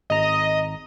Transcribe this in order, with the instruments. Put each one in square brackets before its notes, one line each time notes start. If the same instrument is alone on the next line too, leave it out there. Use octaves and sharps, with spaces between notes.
[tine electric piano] G#1 A#5 [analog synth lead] D#5